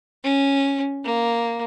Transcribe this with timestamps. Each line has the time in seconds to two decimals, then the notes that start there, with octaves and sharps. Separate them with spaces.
0.24 C#4
1.05 A#3